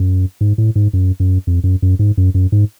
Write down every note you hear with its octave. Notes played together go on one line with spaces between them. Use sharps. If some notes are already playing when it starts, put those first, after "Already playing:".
Already playing: F#2
G#2
A2
G#2
F#2
F#2
F2
F#2
F#2
G#2
F#2
F#2
G#2